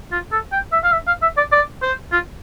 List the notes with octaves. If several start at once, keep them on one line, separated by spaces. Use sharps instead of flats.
F4
A4
G5
E5
F5
E5
F5
E5
D5
D5
C5
F4